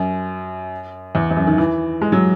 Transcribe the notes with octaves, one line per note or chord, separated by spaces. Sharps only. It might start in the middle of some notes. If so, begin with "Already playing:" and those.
Already playing: F#2
E2
E2
F#2
D#3
E3
G#3
F#3